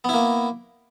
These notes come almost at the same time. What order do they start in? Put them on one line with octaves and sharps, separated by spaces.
B3 E4 A#3